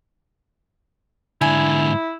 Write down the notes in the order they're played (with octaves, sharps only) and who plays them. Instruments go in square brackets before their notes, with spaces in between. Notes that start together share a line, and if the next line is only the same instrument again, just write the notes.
[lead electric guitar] G#2 D3 [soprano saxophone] E4 [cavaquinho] G#5